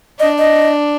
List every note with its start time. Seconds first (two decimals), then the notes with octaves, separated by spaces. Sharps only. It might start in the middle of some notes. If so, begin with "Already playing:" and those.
0.20 D4 D#5
0.39 D#5